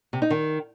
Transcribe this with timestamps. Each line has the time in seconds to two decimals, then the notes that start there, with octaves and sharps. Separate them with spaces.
0.13 C3
0.22 D#4
0.30 D#3